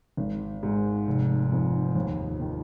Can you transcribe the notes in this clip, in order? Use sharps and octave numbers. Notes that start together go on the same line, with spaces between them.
G#1
G#2
F1
F2
D#2
D#3